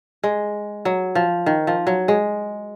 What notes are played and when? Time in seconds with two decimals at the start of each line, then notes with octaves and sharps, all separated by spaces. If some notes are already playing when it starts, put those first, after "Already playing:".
0.23 G#3
0.85 F#3
1.15 F3
1.46 D#3
1.67 F3
1.87 F#3
2.08 G#3